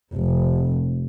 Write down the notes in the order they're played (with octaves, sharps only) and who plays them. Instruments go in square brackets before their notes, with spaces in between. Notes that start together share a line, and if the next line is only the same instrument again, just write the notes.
[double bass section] F1